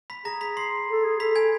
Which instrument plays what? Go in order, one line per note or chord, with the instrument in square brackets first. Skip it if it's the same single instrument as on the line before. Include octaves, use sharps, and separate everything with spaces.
[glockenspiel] B5 B6
[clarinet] G#4 [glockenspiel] A#5 A#6
[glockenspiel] B5 B6
C6 C7
[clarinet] A4
G#4
[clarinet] A4 [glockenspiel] B5 B6
[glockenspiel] G#5 G#6